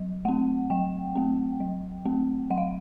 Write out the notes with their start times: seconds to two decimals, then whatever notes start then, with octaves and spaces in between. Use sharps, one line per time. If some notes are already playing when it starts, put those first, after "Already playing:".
Already playing: F#3
0.25 A3 C4 F#5
0.70 F#3 G5
1.15 A3 C4
1.60 F#3
2.05 A3 C4
2.50 F#3 F#5
2.58 F5